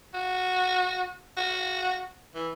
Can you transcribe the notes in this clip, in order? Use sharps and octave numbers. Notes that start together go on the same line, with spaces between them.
F#4
F#4
E3